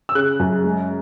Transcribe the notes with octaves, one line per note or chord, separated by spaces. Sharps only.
E6
C#3 F#6
F#2
G#3